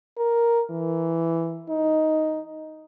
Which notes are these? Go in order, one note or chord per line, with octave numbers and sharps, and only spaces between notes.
A#4
E3
D#4